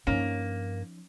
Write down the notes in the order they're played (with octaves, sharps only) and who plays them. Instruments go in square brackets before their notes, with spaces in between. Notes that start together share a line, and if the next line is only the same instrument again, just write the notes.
[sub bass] G2 [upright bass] F3 D#4 [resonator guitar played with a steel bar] A#3 [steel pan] C#4